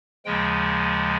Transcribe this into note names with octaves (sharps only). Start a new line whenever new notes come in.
D#2 C#3 F3 G#3 G5